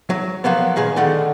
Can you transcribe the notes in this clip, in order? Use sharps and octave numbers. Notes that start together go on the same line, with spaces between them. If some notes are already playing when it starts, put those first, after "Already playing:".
F#3
F3 F#3 A#3 B3
A#2 D#3 G#4 B4
D3 D#3 A3 F#5